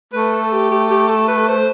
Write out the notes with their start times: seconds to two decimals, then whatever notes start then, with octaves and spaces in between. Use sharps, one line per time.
0.13 A3 B4
0.32 A4
0.52 G4
0.71 G4
0.90 G4
1.09 A4
1.28 B4
1.48 C5